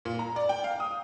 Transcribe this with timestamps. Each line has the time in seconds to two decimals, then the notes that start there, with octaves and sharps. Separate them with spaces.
0.05 A#2
0.19 A#5
0.36 D5
0.49 G5
0.64 F5
0.80 D#6